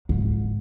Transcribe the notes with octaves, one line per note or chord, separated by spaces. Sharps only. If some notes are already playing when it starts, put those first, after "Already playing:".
G#2